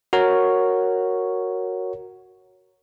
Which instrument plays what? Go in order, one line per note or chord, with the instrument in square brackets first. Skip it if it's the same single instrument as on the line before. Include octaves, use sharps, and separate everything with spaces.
[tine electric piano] F#4 A#4 C#5